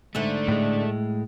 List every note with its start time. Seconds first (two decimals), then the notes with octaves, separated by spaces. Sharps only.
0.15 G#2 D3 A3 E5
0.48 A2 G#3